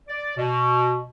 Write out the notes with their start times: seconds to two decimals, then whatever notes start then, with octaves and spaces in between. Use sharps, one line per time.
0.09 D5
0.37 B2